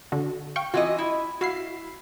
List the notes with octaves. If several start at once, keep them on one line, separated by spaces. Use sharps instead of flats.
D3 F#4
F5 G5 C#6
E3 C4 F4 F#4 D#5
E4
E4 F#4 F5 C7